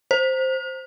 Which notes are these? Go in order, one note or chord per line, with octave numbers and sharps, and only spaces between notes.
C5